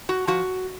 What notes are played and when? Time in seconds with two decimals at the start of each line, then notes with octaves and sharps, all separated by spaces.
0.09 F#4
0.27 F3 F#4